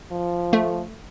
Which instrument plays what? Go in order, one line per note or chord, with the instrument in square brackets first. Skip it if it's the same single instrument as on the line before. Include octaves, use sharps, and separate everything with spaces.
[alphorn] F3
[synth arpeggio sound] A3